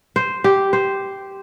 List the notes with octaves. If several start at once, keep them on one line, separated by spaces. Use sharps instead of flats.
C5
G4
C5